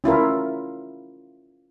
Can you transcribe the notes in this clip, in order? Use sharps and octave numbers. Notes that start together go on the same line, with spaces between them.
C#4 E4 F4 A#4